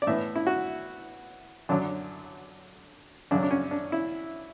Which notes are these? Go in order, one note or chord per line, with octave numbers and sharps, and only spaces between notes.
D5
A2 E3 B3 E5
E4
F#4
F#2 D3 F#3 D4
F#2 C#3 F#3 D4
D4
C#4
D4
E4